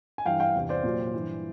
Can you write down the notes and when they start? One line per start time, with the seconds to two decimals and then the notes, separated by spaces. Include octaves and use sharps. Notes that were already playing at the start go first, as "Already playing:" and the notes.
0.18 G#5
0.26 G2 E3 F5 G5
0.40 F5 G5
0.55 E2 C3 E3
0.69 C5 D5
0.84 A#2 F#3
1.14 G2 E3